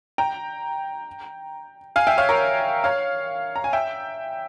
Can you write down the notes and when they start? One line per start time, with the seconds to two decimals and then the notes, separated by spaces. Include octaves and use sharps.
0.18 G5 A#5
1.96 F5 G#5
2.07 E5 G5
2.18 C#5 F5
2.29 A#4 C#5
2.84 C#5 F5
3.56 A#5
3.64 G#5
3.73 E5 G5